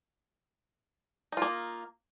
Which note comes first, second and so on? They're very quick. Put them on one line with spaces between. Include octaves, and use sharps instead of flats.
D#4 F4 A#3